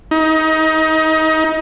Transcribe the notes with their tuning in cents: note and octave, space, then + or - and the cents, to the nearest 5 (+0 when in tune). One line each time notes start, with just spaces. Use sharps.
D#4 +25